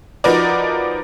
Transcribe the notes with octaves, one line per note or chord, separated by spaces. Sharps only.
F3 D#4 F#4 A#4 B4 D5